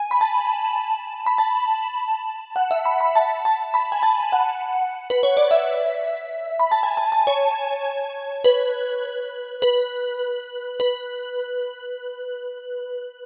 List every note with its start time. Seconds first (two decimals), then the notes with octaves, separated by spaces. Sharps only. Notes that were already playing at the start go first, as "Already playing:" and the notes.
Already playing: G#5
0.11 B5
0.21 A5
1.26 B5
1.38 A5
2.56 F#5
2.71 E5
2.85 B5
3.01 B5
3.15 A5
3.45 A5
3.74 B5
3.92 G#5
4.03 A5
4.32 F#5
5.10 B4
5.23 C#5
5.37 D5
5.51 E5
6.60 B5
6.71 A5
6.83 G#5
6.97 A5
7.12 A5
7.27 C#5
8.44 B4
9.62 B4
10.80 B4